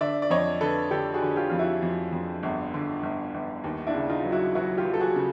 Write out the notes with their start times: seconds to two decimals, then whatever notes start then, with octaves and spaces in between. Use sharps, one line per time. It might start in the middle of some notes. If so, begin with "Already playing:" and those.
0.01 D3 D5 E5
0.22 D5
0.30 F2 C#5 D#5
0.61 D3 A4 B4
0.91 D3 G4 A4
1.14 F#4 G#4
1.22 D3
1.36 F4 G4
1.50 F2 F4
1.59 E4 F#4
1.82 F2
2.12 F2
2.43 G1
2.74 D3
3.03 G1
3.34 G1
3.64 D#2
3.87 D4 E4
3.95 C#3
4.09 D#4 F4
4.25 F#3
4.32 E4 F#4
4.55 F#3 E4 F#4
4.77 F4 G4
4.85 F#3
4.94 A4
5.00 F#4 G#4
5.16 C#3